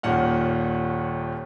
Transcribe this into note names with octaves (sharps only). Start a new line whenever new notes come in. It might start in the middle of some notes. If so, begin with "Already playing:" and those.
D#1 D#2 A#2 F#5 F6